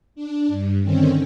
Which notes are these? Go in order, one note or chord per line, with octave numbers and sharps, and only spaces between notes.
D4
G2
D3 D#3 C4 C#4